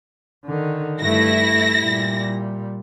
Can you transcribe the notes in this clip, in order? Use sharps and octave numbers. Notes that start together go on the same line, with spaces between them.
D3 D#3
G2 A3 E4 A#6
A#2 G3